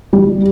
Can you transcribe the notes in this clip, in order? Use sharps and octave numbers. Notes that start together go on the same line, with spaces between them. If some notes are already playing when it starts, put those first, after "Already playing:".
G3